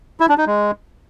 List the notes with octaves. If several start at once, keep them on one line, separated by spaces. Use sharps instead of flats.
E4
D4
D#4
G#3